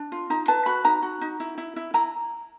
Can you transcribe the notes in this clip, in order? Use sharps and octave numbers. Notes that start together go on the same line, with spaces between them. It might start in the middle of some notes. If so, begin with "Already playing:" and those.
Already playing: D4
F4
D#4 A#5
B4 A5
F#4 B5
D#4 A#5
F#4
D#4
E4
E4
E4
E4 A#5